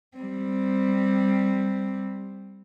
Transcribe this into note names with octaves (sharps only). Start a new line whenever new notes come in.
G3 C4